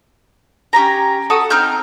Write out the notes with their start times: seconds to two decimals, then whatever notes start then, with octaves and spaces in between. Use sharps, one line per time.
0.73 C#4 G4 G#5 A#5
1.30 F#4 A4 A5 D#6
1.50 C4 D#4 F6 G6